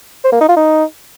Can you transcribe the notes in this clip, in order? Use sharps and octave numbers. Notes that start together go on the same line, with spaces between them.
C5
A#3
D#4
F4
D#4